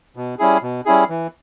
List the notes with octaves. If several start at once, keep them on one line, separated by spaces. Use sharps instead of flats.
B2
G3 C#4 E4 G#4
B2
G3 C#4 E4 G#4
E3